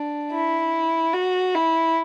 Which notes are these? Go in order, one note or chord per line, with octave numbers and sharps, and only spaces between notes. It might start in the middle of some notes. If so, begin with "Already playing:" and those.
Already playing: D4
E4
F#4
E4